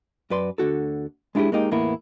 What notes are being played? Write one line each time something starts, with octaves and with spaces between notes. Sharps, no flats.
F#2 F#4 B4 D5 C6
D2 D3 F#4 A4
G#3 D4 E4 F4 G4 G#4
G#3 A#3 D#4 G4
E2 A2 A#3 B3 E4